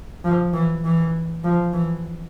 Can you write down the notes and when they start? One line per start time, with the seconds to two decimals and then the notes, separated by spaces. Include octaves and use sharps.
0.24 F3
0.54 E3
0.84 E3
1.44 F3
1.73 E3